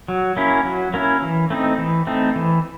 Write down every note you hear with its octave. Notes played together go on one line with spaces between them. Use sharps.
F#3
A#3 C#4 E4
F#3
A#3 C#4 E4
E3
A3 C4 D#4
E3
A3 C4 D#4
E3